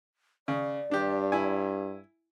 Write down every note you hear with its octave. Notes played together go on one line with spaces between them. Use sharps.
C#3 D5
G2 D4 G4
E4 G#5